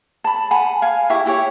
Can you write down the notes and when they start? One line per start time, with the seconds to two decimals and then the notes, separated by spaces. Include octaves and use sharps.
0.24 A5 B5
0.51 F#5 G#5 B5
0.82 F5 G#5
1.10 E4 G4 E5 C#6
1.26 E4 G4 C#5